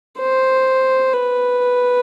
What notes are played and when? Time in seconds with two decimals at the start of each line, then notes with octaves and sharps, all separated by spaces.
0.19 C5
1.14 B4